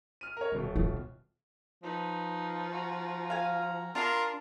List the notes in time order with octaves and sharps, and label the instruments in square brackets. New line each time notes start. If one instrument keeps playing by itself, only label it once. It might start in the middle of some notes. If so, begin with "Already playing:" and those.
[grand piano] F6 D#7
A#4 C#5
D#1 B2
[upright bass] F4
[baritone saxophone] F3 [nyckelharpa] D#4 B4
[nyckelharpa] F#4 A#5
[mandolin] F5 G#5
[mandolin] D4 A#5 C6 [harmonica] F4 A#4